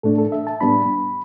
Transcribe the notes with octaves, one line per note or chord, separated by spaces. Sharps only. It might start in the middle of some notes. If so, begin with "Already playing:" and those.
A2 A3 D4 A4
A4
E5
A5
A2 G3 B3 D4 B5